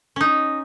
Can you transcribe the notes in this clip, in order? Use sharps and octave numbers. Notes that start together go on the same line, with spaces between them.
C#4 D#4